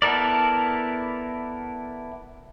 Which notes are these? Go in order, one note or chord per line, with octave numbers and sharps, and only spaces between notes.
B3 E4 A4 A#4 D5